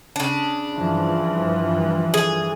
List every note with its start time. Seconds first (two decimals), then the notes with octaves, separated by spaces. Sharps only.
0.16 C#3 D4
0.77 G2 E3 F3
2.14 G#4